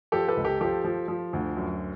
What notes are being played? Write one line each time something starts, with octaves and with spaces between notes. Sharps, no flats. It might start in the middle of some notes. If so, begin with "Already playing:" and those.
F3 G4 A4
A4 B4
C#2
G4 A4
F3 G4 A4
F3
F3
D2
F#2